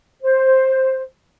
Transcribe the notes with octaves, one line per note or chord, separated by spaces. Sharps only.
C5